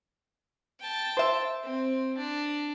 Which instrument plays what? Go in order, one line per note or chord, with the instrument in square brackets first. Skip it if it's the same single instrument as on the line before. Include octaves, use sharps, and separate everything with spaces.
[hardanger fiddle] G5 A5
[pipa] C5 E5
[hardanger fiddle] C4
D4